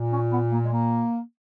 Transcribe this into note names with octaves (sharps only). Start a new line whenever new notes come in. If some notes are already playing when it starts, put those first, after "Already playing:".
Already playing: A#2
C#4
B3
A#3
G#3
A#3